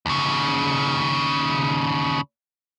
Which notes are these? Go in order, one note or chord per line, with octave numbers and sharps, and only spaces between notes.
D#2 C#3